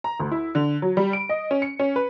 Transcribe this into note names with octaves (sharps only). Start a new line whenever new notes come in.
A#5
D2
E4
D3
F#3
G3
D7
D#5
C#4
C#7
C#4
B4